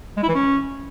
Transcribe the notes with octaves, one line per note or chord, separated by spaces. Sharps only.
G#3
E4
E3
C#4